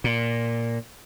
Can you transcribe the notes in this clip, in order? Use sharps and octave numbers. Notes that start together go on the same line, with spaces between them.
A#2